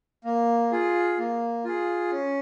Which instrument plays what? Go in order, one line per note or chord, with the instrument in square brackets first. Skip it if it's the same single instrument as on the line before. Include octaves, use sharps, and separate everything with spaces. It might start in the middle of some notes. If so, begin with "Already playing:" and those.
[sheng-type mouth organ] A#3
F4 G#4
A#3
F4 G#4
C#4